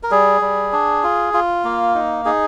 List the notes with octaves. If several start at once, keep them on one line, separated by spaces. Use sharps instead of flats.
A#4
G3 G#4
G3
D4
F4
F4
A#3
D#4
D#4 G#4